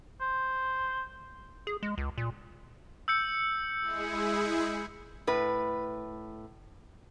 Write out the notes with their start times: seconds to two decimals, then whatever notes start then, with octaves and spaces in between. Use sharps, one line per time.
0.21 C5
1.67 G#4
1.83 G#3
1.98 C#2
2.18 A#2
3.08 E6 G6 C#7
3.81 G#3 E4 G#4
5.27 A2 B4